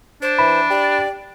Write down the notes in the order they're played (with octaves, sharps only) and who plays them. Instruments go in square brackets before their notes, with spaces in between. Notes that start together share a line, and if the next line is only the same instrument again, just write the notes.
[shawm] D4 [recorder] C5
[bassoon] E3 [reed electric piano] B5
[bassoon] G4 [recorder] D5